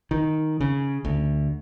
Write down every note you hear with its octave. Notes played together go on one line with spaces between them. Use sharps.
D#3
C#3
D2